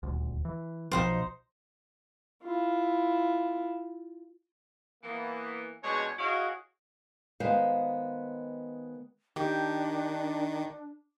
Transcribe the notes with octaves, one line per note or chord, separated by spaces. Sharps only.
D#1 D2
E3
B1 B2 F3 D#4 F#4 C5
E4 F4
E3 A#3 B3
B2 G#3 C#4 D4 C#5
E4 F#4 G#4 C#5 D#5 F5
D#3 G#3 B3 C5 F5
D#3 D4 G4